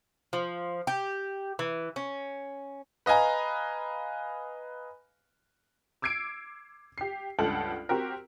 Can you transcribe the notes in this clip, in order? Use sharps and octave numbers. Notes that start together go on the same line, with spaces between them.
F3
G4
E3
C#4
B4 D#5 F5 G#5 A#5
D6 E6 G#6 C7 D7
G4 C7
C#2 G2 A4 F#5 F6 F#7
C4 F#4 G4 A#4